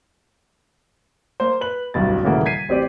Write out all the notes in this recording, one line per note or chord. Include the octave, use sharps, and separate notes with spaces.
A#3 C5
B4 F#7
D1 B1 G2 A6
D#1 C#3 E3 A3 A#3 F#5
G#6 B6 C7 D#7
A1 C4 G4 D5